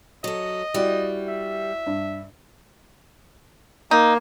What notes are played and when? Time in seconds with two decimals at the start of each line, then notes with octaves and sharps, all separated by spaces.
0.24 F#3 A4 D#5
0.74 G3 E4 F#4 D5
1.28 E5
1.87 G2
3.91 A#3 D#4